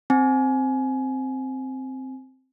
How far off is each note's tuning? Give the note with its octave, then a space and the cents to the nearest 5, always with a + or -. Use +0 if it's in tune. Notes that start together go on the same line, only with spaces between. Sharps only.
C4 +0 G#5 +20